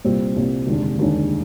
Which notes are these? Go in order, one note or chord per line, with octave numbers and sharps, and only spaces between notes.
C2 A#2 G3 C4
C2 A#2 G3 C4
F1 D#2 D3 G#3 D4
F1 D#2 D3 G#3 D4